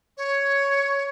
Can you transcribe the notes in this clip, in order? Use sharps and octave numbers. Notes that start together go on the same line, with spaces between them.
C#5